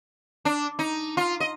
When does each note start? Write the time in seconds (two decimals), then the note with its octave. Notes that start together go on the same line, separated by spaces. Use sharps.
0.45 D4
0.79 D#4
1.17 F4
1.40 D#5